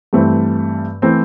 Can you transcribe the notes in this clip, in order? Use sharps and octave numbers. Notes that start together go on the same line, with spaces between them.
G2 E3 A3 C4
E3 A3 C4